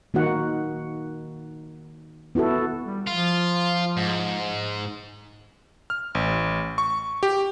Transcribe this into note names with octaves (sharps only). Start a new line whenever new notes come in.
D#3 A#3 D#4 F#4 F#5
B3 E4 F#4 A4
G3
F3 F4
G#2
F6
A1
C#6
G4